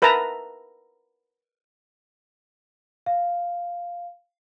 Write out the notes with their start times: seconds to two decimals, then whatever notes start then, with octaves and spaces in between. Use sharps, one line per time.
0.02 A#4 B4 E5 A5 A#5
3.06 F5